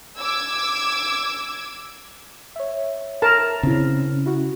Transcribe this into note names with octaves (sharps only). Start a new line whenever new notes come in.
D6 E6 G#6
C#5 E5
A#4 A5
C#3 C4 E4
E4 F#4